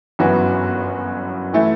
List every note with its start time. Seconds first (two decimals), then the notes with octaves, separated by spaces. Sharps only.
0.19 G1 F#2 E3 B3 F#4
1.53 E3 A3 E4